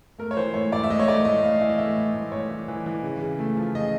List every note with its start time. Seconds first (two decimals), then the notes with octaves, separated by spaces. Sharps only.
0.18 A3 A#4
0.31 C#5
0.37 E3 C5
0.54 A2 C#5
0.72 A2 D5
0.84 E5
0.90 A2 D#5
1.00 C#5
1.08 A3 D5
1.25 A2 D#5
1.43 A2 F5
1.61 E3 E5
1.69 D#5
1.78 A3 E5
1.96 A2
2.14 A2
2.32 A2 C#5
2.51 E3
2.68 E3
2.86 E3
3.03 C#3
3.22 C#3
3.39 A3
3.57 F3
3.74 C#3 D#5